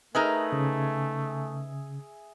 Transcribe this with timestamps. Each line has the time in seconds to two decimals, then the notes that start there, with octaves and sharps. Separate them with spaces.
0.15 A3 D#4 G#4 A#4 B4 E5
0.52 C#3